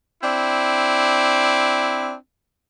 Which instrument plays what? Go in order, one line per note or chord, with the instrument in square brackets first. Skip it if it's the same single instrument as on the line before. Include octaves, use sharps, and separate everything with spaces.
[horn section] C4 D4 E4